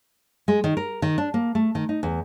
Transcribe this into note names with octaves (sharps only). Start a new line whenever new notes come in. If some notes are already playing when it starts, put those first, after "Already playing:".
G#3
D#3
A#4
D#3
D4
A#3
A3
D#3
D#4
E2